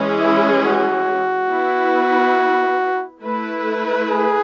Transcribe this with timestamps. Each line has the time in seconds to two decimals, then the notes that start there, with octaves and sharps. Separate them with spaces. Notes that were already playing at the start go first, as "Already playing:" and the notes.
Already playing: E3 G#3 C#4 G#4
0.19 E4
0.62 F#4
1.49 B3 E4 B4
3.22 A3 E4 B4
4.08 G#4